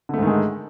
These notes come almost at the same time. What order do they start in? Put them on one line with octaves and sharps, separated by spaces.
D3 A3 G#2 D#3 G#3